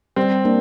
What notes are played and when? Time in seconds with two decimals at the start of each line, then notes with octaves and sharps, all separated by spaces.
0.16 G3 C4
0.45 A#3 D4